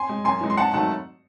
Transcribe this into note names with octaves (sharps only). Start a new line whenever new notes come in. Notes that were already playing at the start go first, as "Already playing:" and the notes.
Already playing: G#5 C6
G#3
F#2 G#5 C6
E3 G#3
C6
G#2 F#5 A5
D#3 F#3 A3 F#5 A5